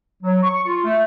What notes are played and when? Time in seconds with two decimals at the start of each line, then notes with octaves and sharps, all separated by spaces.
0.23 F#3
0.43 C#6
0.66 F4
0.84 A3